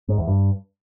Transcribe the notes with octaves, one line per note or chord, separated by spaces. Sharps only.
G#2
E2
G2